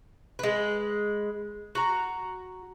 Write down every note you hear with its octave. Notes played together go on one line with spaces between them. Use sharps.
G#3 B4
F#4 A#5